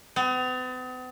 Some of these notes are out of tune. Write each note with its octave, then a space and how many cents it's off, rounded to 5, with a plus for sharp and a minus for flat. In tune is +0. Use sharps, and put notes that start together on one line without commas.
B3 +45